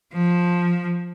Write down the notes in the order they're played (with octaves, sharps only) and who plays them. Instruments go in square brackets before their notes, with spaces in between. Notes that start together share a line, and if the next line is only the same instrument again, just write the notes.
[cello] F3